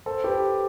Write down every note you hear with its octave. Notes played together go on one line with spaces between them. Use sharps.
A4 C5
G4 B4